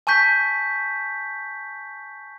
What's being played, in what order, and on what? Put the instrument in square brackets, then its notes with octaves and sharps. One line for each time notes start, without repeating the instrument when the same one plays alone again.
[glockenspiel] G#5 A5 C#6 G6 B6